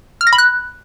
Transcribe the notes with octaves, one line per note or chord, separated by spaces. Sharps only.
F6
A#6
B5
F#6